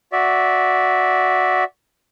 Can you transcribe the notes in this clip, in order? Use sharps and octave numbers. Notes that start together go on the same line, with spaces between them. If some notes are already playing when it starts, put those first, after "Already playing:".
F#4 D5 E5